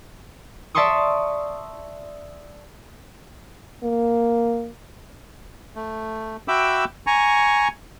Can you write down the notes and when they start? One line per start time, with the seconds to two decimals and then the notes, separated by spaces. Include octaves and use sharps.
0.75 D5 E5 A5 C6 C#6 D#6
3.84 A#3
5.76 A3
6.48 F#4 E5 G5 B5 D6 E6
7.07 G#5 A#5 C#6